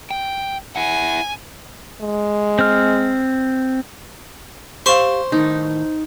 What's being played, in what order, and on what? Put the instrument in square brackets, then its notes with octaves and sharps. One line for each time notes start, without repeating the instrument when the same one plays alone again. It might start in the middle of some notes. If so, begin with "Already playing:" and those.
[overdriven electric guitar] G5
[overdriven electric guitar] E4 F#5 [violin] G#5
[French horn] G#3
[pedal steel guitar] C4 F6
[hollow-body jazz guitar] G4 F5 [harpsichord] C5 [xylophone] C6 C#6 E7
[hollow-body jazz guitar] A2 D#3 [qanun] D#4